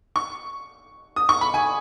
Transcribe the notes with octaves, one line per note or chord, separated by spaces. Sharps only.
C#6
D#6
C#6
B5
G#5